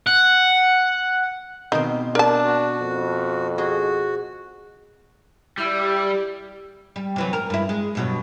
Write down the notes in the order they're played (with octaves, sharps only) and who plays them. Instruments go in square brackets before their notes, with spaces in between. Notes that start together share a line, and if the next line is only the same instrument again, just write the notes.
[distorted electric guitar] F#5
[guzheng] B2 D#3 C4 [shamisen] D#4
[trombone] D4 [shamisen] A#4 A5
[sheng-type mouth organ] F#4
[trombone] F2
[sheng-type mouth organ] F#4 [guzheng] G#4 D#5
[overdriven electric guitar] G3 [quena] E4 [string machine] G4 D5
[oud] G3
C3 E3 F#3
A#4
G2 E4
G#3
G2 B2 F#3